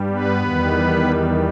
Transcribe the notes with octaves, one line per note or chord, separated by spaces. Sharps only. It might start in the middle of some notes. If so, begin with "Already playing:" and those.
Already playing: G2 G3
B3 B4
E2 D#3 G3